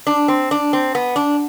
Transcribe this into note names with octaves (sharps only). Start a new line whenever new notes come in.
D4
C4
D4
C4
B3
D4